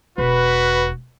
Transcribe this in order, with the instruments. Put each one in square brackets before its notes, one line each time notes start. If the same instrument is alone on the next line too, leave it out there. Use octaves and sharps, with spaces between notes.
[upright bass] E1 [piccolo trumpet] F#4 [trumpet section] B4